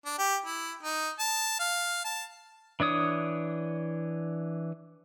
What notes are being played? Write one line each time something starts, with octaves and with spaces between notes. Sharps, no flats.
D4
G4
E4
D#4
A5
F5
A5
E3 D4 C#5 D#6